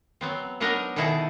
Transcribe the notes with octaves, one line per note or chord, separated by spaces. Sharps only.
F#3 B3 C4
F#3 B3 D4 D#4 A#4 D#5
B2 D#3 D#4 E4 G#4 A4